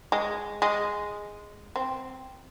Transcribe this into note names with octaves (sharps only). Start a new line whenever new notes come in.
G#3
G#3
C4